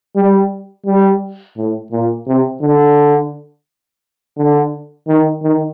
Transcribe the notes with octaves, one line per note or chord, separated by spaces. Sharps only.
G3
G3
A2
A#2
C3
D3
D3
D#3
D#3